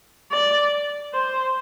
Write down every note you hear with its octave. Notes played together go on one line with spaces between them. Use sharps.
D5
C5